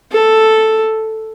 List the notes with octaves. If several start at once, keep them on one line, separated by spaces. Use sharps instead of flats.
A4